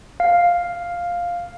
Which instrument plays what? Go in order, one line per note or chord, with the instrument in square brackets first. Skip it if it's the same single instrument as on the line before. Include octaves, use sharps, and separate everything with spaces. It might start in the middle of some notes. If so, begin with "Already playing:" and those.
[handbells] F5